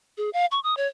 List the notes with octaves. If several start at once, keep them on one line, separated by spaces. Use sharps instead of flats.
G#4
F5
C#6
D#6
C#5